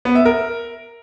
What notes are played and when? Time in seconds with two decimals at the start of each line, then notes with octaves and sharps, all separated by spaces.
0.05 B3
0.15 E5
0.25 A#4